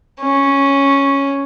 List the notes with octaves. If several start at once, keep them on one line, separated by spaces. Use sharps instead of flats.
C#4